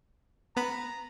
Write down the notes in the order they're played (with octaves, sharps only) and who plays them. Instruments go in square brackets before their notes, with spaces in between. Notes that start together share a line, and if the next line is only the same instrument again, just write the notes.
[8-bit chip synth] B3 B5 [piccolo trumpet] A#5